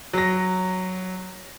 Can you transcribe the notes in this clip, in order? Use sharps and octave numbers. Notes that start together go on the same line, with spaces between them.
F#3 A#6